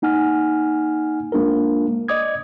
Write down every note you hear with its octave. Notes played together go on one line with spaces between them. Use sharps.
A#3 D#4 F#5 G#5 F6
G#3 A#3 D4 F4 A#4
D5 D#5 D6 D#6 G#6